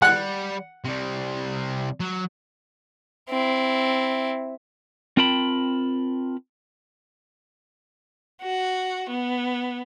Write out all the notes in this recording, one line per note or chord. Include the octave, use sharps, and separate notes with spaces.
G3 F#5 F#6
C3 G3
F#3
C4 E4
C4 F4 A#4 G5 A5 B5
F#4
B3